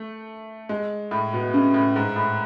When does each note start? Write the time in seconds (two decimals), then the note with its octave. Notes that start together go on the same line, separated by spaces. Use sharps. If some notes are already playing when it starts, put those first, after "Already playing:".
Already playing: A3
0.69 G#3
1.11 A2
1.33 B2
1.54 C#3
1.74 A2
1.96 G#2
2.16 A2